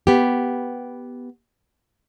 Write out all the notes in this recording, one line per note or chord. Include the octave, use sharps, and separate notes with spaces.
B3 G4